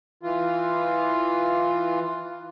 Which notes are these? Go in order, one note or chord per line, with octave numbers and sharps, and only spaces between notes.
E3 F4